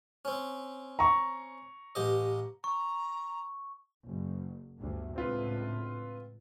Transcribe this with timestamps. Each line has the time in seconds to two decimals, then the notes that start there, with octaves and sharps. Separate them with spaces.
0.25 C4 C#4
0.99 A#5 C#6
1.95 A1 G4 D#5
2.64 A#5 C#6
4.06 F#1
4.79 G1 D2
5.16 C#2 A2 D3 C4 F4 B4